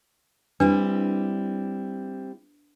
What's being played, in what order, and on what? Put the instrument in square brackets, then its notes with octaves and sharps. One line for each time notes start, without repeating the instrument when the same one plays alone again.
[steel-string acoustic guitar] G3 C4 E4 [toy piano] D4 B4